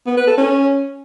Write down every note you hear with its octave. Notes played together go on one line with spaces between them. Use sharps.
B3
B4
A4
C#4